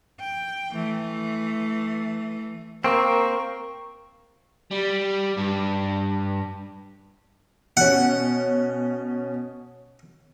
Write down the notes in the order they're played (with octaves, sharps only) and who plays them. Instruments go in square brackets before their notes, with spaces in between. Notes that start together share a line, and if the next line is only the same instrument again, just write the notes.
[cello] G5
E3 A3
[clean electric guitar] A#3 C4 [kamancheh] A#4 [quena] C#6
[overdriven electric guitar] G3
G2
[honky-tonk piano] B2 C#4 [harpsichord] F#5